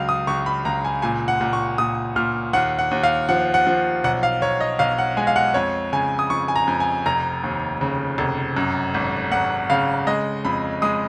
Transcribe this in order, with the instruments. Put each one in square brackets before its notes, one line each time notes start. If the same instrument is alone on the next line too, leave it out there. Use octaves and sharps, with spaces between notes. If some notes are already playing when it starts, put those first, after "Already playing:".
Already playing: [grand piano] C#2 F#3 F5
D#6
C#2 C#6
B5
C#2 A#5
G#5
A#2 G#5
F#5
A#2
C#6
A#2 D#6
A#2 F6
D#2 F#5
F#5
D#2
F5
F3 F#5
F#5
F3
B1 F#5
F5
B1 C#5
D#5
B1 F5
F#5
G#3 G#5
F5
F#5
F2 C#5
C#3 G#5
D#6
F2 C#6
G#5
A#5
F2
G#5
F1 A#5
D#2
C#3
F1
F#2
G#1
G#1 F#5
C#3 F5
G#3 D#5
F2 B5
G#3 D#6